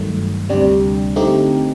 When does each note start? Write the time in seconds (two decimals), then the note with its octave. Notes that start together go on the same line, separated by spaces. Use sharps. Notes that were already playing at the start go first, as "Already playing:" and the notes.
Already playing: G2 D#3 F#3 A3
0.49 D2 C3 G3 D4 G4
1.16 D3 A3 C4 D#4 G4